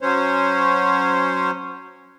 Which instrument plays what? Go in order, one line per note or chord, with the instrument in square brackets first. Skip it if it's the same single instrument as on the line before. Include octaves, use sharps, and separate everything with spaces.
[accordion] F#3 C#4 C5 C#5